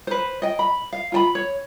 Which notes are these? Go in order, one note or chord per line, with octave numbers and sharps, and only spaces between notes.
B4 C5
D#5 G5
B5
F5
F4 G5 B5
C#5